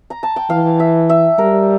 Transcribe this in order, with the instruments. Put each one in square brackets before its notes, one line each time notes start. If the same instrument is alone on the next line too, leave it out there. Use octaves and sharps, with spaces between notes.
[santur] A#5
A5
G5
[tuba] E3 [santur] F5
[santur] E5
E5
[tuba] G3 [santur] A#4